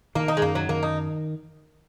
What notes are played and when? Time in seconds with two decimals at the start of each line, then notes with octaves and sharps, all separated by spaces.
0.15 D#3 A#3
0.28 D#4
0.37 G#3
0.42 F#2 A#3
0.55 F#3
0.69 D#3 A#3
0.83 D#4